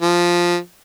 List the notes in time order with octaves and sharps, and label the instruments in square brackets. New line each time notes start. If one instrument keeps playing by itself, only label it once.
[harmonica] F3